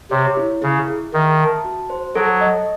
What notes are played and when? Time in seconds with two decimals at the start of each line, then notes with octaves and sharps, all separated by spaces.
0.11 C3 C#5
0.37 E4
0.62 C#3 E4
0.88 G#4
1.13 D#3 E5
1.39 A5
1.64 F#4
1.90 C5
2.15 F#3 A4
2.41 D#5